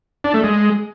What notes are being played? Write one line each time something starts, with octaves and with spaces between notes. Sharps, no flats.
D4
A3
G#3